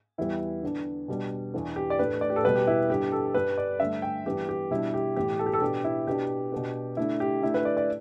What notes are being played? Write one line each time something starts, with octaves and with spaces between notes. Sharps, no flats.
E2 E3 G3 B3 E4
D3 B3 D4
B2 G3 B3 D4
E2 E3 B3 D4
G4
D5
A2 A3 D4 B4
D5
G4
A4
E2 B2 G3 B3 B4
G4
E4
G2 D3 G3 B3 G4
A4
G2 G3 D4 B4
D5
G2 D3 A3 E5
G5
G2 E3 B3 D4 G4
G4
B2 G3 D4 E4
G4
A2 E3 B3 G4
A4
G4
A4
B2 B3 D4 G4
E4
B2 B3 D4 G4
B2 B3 D4
D3 A3 D4 E4
G4
D3 A3 D4 E4
B4
D5
D5